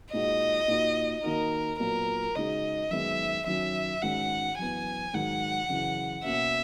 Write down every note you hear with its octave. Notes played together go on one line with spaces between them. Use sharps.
A#2 G#3 D#4 F#4 D#5
A#2 A#3 D#4 F#4
D#3 A#3 D#4 F#4 A#4
A#2 F#3 B3 A#4
C#3 G#3 D#4 F#4 D#5
F#2 D#3 G#3 B3 E5
F#2 D#3 F#3 C#4 E5
G#2 D#3 G#3 C#4 F#4 F#5
F#2 E3 B3 G#5
G#2 D#3 F#3 F#5
F#2 C#3 E3
B2 A#3 C#4 E5